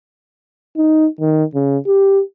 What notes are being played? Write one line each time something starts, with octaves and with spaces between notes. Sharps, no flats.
D#4
D#3
C#3
G4